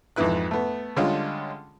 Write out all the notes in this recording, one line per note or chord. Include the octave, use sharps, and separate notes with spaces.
F2 G#2 E3 E4 B4 F#6
A3 B3
D3 G3 G#3 C#4 F4